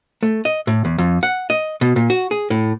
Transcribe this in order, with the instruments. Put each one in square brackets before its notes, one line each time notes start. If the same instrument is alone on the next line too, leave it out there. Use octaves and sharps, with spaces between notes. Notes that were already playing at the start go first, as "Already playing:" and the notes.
[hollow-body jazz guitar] A3
D#5
A2
E2
F2
F#5
D#5
B2
A#2
F#4
G#4
A2